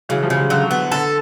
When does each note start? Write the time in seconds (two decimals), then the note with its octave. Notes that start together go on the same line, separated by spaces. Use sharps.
0.09 C#3 E3 F#3
0.23 F3 G3
0.30 C#3
0.37 F#3 G#3
0.50 D3 F#3
0.71 B3
0.92 D3 A4